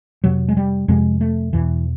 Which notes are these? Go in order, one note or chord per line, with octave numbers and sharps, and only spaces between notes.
F2 C3 F#3
G#3
G3
F2 C3 G#3
A3
E2 B2 E3